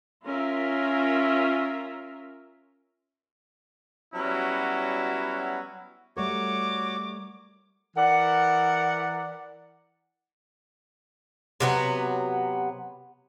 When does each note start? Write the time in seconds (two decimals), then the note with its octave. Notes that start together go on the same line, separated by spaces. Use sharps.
0.24 C#4 F4 A#4 E5
4.15 F#3 G3 B3 C#4 E4 F#4
6.17 G3 A3 F#4 A#4 C#5 D6
7.97 E3 A#4 D5 F#5
11.60 C3 F#3 B3